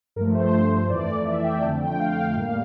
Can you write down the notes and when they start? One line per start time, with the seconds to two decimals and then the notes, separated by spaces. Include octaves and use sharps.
0.16 G2 F3 A3 A#4
0.35 C5
0.90 F2 E3 A3 D5
1.25 E5
1.44 G5
1.62 F2 D3 A3 A5
1.80 G5
2.00 F5
2.36 A2 G3 A#3 F5